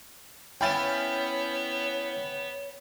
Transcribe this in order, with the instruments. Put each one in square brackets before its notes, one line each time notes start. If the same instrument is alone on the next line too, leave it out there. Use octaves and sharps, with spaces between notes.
[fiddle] B3 [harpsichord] C#4 E4 F5 [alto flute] C#5 [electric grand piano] G5 B5 A6